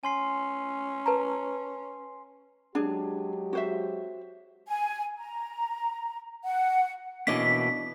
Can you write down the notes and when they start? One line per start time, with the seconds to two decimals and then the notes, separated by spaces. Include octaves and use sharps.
0.04 C#4 G#5 C6 C7
1.06 B4 A5 A#5
2.75 F#3 G#3 D4 G4 G#4
3.53 F#4 C5 E5
4.67 G#5
5.17 A#5
6.44 F#5
7.27 B2 E3 A#3 C#4 D4 D#5 B6